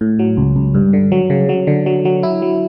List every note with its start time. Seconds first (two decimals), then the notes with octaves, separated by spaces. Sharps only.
0.01 A2
0.19 F#3
0.37 C#2
0.56 C#2
0.75 G2
0.93 D3
1.12 F#3
1.30 C#3
1.49 F#3
1.67 D3
1.86 F#3
2.05 F#3
2.23 E4
2.42 F#3